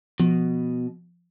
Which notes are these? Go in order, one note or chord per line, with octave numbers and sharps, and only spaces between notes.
B2 F3